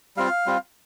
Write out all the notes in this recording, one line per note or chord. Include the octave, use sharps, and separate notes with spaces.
G3 C4 F4 F5
G3 C4 F4